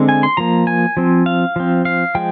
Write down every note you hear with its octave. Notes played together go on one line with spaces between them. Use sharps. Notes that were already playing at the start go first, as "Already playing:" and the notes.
Already playing: D3 G#3 C4
G#5
C6
F3 A#3 A#5
G#5
F3 C4
F5
F3 C4
F5
F3 G#3 G5